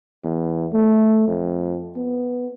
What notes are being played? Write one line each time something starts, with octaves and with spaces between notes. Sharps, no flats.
E2
A3
F2
B3